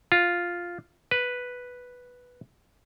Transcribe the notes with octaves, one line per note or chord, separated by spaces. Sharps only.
F4
B4